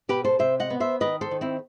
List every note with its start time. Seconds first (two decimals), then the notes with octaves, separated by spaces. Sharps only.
0.09 B2 G4 B4
0.25 A4 C5
0.39 C3 C5 E5
0.60 D#5 F#5
0.70 B3
0.80 C5 E5
1.00 D#3 B4 D#5
1.21 A4 C5
1.31 D#3
1.41 C4 E4